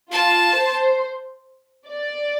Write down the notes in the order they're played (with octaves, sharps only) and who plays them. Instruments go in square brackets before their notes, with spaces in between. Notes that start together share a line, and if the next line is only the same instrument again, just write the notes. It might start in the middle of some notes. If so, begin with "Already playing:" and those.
[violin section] F4 [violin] A5
[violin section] C5
D5